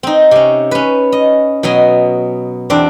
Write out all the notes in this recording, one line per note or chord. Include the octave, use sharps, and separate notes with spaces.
C4 D#4
C3 C#4
C#4 B4
D#5
B2 F#3 D#5 G#5
E2 C4 D4